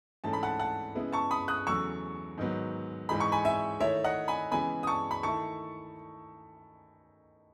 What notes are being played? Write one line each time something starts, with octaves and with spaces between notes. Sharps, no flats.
G#2 E3 A3 C#4 A5
B5
F#5 A5
F#5 A5
C#3 G#3 B3 E4
A5 C#6
B5 D#6
D#6 F#6
E2 C#3 F#3 A3 C#6 E6
G#2 D#3 F#3 B3
G#2 E3 G#3 D#4 B5
C#6
G#5 B5
E5 G#5
D#3 A3 E4 C#5 E5
D#5 F#5
G#5 B5
C#3 E3 G#3 B3 G#5 B5
D#6
A5 C#6
B5
D#3 A3 E4 A5 C#6